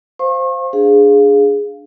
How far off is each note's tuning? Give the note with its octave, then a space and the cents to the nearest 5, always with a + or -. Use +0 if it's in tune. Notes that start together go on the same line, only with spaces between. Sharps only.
C5 +0 F5 +0 C#6 -40
D4 +0 G#4 +0 F5 +0